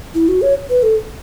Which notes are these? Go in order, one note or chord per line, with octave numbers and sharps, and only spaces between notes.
E4
F#4
C#5
B4
A4